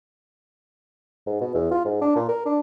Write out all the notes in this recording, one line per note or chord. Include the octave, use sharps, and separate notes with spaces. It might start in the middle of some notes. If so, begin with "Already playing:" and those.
G#2
B2
E2
F4
G#2
D4
A#2
A#4
D4